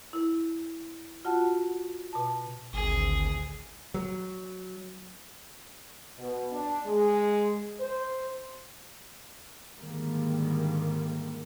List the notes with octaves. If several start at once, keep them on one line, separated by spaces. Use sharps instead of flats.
E4
F4 F#4 F#5 A5
B2 A5
G#1 D2 A2 G#4
F#3
B2
D4
G#3
C5
G#2 D3 D#3 G3 A#3